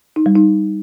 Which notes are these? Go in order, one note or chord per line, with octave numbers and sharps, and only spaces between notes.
D#4
G3
D#4